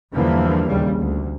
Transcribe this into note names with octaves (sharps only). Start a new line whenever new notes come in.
E2 G2 D3 E3 F3 A#3
A#1 D#2 C#3 G3
D2